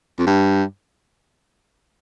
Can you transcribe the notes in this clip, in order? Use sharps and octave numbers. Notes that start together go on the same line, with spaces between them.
F2
G2